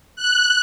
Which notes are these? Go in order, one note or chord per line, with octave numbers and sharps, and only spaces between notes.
F#6